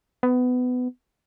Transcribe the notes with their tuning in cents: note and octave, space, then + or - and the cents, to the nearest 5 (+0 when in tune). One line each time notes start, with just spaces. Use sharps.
B3 +20